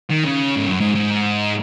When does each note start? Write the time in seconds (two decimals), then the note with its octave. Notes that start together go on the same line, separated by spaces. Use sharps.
0.10 D#3
0.24 C#3
0.56 G#2
0.67 F#2
0.81 G#2
0.95 G#2